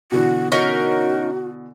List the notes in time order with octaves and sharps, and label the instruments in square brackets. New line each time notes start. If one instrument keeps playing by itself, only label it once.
[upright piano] B2 D3 E3 [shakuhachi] F#4
[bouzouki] C#4 D#4 A#4 [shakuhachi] F#4